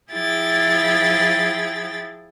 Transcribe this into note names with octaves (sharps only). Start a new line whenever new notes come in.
F3 E4 G#4 G5 A6